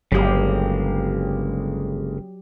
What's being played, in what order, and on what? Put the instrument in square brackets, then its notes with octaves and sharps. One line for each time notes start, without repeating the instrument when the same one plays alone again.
[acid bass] G1 [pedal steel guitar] C#3 G#3 A#3 [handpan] F#3 G4